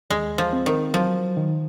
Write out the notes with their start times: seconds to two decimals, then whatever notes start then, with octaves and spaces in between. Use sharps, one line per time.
0.10 D#2 G#3
0.38 F3
0.53 C4
0.66 D#3
0.94 F3 F#3
1.37 D#3